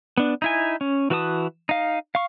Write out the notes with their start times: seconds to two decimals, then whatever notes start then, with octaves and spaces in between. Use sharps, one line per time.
0.17 B3 D4
0.42 D#4 E4 G#5
0.81 C#4
1.10 E3 F#4 B4 A5 D#6
1.69 D#4 F5
2.15 F5 C#6